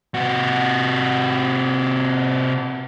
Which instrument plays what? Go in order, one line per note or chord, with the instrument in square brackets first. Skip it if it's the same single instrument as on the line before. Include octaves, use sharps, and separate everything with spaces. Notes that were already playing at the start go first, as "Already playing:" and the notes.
[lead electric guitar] C3 F#4